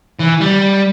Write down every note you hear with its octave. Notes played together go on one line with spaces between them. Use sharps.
E3
G3